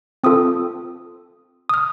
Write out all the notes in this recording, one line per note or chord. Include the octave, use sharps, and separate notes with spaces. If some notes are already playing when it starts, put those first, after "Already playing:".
C4 F4 A4 D#6
D#6
F6